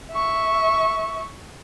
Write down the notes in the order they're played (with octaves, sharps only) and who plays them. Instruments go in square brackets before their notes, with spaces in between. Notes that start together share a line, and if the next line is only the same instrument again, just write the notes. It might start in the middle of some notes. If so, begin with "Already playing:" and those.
[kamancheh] E5 C#6